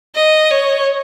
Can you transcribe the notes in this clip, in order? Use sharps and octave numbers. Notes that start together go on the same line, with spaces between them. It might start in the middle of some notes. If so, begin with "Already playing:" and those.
D#5
C#5